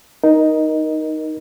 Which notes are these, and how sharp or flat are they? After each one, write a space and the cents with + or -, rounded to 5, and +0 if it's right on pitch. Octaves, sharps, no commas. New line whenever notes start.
D#4 +0 A#4 +20 D#5 +0